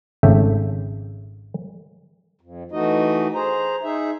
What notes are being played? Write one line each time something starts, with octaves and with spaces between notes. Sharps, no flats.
G#1 C#3 A3 E5 G5
F2
E3 A3 D#4 F#4 D#5
G#4 C5 A#5
D#4 G#4 E5